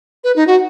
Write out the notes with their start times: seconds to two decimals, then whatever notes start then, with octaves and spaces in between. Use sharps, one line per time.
0.24 B4
0.36 D#4
0.47 F#4